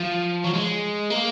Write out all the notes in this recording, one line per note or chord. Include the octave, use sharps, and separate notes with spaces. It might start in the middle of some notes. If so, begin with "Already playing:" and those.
Already playing: F3
F#3
G#3
A#3